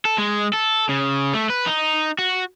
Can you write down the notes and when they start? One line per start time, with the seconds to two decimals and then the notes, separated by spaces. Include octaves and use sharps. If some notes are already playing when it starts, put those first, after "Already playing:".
0.05 A4
0.18 G#3
0.53 A4
0.89 C#3
1.34 A3
1.50 B4
1.66 D#4
2.19 F#4